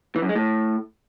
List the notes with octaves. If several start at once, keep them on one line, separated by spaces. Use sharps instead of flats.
E3
F#2
G#3
A2